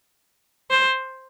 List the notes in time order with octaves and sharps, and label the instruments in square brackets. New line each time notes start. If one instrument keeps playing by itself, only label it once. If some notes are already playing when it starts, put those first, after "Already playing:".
[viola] C5